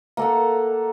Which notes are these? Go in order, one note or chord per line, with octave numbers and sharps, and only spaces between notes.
A#3 A4 F#5